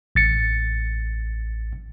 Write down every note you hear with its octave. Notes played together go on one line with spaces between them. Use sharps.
A1 A6 C#7